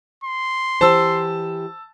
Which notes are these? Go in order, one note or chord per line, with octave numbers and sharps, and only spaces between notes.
C6
E3 G4 C5 A5 E6